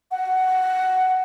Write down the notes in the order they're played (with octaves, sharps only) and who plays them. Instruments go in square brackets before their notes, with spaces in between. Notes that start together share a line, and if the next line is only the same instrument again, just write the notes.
[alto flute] F#5